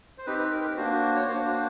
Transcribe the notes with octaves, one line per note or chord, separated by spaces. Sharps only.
C5
C4 D#4 G4 B4
B4
A#4
B4
A#3 D4 F#4 C5
C5
C#5
A#3 D4 F#4 C5
C5